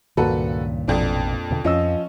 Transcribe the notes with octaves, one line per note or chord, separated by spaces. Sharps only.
C#2 G2 A#2 D#3 F#4 A4 B4
A1 F2 B2 C4 D4
E2 B2 D3
F2 F3 C#4 D#5 E6